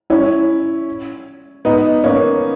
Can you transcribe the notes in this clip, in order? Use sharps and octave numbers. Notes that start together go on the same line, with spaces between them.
C#4 E4
B3 D#4
A#3 C#4